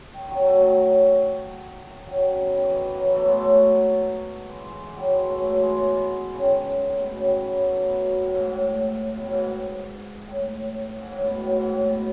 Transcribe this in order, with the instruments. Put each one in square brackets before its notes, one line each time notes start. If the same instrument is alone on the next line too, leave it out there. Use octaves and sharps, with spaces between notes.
[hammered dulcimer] D#3
D#3 F#3
F#3 A3
D#3 F#3
D#3 F#3
D#3
C#3
B2
D#3
E3
D#3
F#3
E3
F#3 A3
G#3 B3
F#3 A3
E3 G#3
E3 G#3
E3
D#3 F#3
E3 G#3
F#3 A3
F#3 A3
E3 G#3
B2
C#3
D#3
A2
B2
C#3
D#3
E3
F#3
E3
B3
F#3 A3
B2
A2
G#2
A2
A2
B2
A2
G#2
A2
G#2
A2
B2
A2
G#2
A2
B2